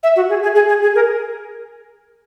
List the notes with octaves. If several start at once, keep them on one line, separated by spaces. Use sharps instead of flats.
E5
F#4
G#4
G#4
G#4
G#4
G#4
A#4